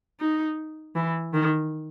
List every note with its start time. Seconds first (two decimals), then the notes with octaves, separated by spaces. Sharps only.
0.20 D#4
0.96 E3
1.34 D#3